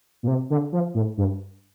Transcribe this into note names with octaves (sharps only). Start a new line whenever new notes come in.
A#2
C3
D3
F3
A2
G2